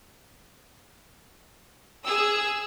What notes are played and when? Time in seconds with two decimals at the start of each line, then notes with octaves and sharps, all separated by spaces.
2.05 G#4 E6